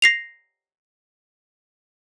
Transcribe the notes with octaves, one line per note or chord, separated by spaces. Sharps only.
A#6 C7 F7